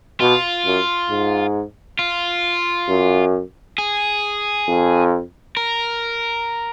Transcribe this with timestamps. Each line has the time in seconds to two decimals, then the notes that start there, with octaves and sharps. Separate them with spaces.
0.20 B2 F4
0.65 F#2
1.10 G#2
1.99 F4
2.88 F#2
3.78 G#4
4.67 F2
5.57 A#4